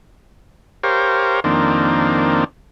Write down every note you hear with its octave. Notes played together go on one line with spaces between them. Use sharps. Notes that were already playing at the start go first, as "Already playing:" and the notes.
G4 A#4 C5 C#5 F5
F2 D#3 A#3 C4 D4